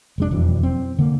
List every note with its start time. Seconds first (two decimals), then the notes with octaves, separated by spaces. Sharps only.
0.18 F1 G#3 D4
0.31 E1 F2 E3 F#3
0.63 C4
0.99 D3 A#3